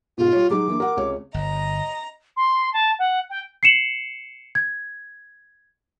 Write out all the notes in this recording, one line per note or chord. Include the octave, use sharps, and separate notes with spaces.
G#2 B2 F4
G3 C#5
F#3 G#3 D#4 D6
E3 A#3 D4
A#4 F#5
C#2 C3 C#5
G1 D#5 A#5
C6
A5
F#5
G5
C7 C#7 E7 F#7
G#6